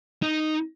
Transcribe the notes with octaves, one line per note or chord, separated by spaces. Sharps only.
D#4